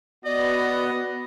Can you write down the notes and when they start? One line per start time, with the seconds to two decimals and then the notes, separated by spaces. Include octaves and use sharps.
0.24 B3 F#4 D5 D#5